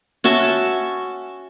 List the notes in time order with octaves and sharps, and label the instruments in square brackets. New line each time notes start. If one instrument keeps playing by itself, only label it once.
[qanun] C#4 F#4 E5 A5